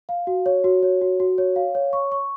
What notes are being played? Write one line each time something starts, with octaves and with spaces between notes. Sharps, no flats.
F5
F#4
C#5
F#4
C#5
F#4
F#4
C#5
F5
C#5
C#6
C#6